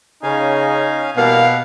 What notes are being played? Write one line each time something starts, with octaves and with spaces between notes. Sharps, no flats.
C#3 C#4 D#4 F5 G#5
B2 E3 G3 A#3 F5